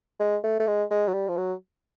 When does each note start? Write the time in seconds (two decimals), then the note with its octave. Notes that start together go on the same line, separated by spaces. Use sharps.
0.20 G#3
0.44 A3
0.60 A3
0.67 G#3
0.91 G#3
1.08 F#3
1.14 G3
1.29 F3
1.37 F#3